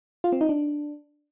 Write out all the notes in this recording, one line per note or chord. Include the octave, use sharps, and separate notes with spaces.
F4
C4
D#4
D4